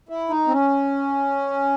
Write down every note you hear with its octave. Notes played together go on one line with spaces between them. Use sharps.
E4
D#4
C4
C#4